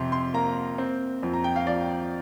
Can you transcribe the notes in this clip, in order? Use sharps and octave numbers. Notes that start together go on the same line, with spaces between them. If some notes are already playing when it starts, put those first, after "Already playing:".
Already playing: F2 C3 C6
C6
A#3 A#5
C4
F2
A#5
G5
F5
F3 D5